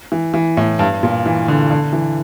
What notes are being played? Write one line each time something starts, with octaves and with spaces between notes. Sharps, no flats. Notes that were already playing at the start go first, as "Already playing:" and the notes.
E3
E3
A2
G2
A#2
E3
D3
D3
E3